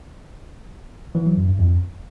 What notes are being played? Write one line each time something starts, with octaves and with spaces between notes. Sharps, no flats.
E3
F#3
F#2
G2
F2